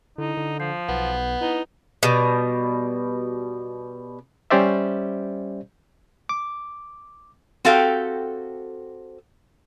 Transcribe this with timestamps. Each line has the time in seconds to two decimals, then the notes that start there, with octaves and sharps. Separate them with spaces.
0.18 D3 D#4 E4
0.37 D3
0.60 F3 G6 C7
0.89 B1 B3
1.41 D#4 E4 B4 G7
2.03 B2 G3
4.50 G3 C#4 G4 C5 D5 E5
6.29 D6
7.65 C4 F#4 G4 A4 F5 G5